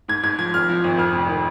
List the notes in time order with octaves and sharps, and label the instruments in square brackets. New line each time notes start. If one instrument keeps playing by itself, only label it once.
[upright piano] G#2 [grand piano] G#6
[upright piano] G#2 [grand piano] G#6
[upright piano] F3 [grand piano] G#6
[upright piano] G#1 [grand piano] F6
[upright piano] F3
G#1
[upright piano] F2 [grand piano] F6
[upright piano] F1
D#3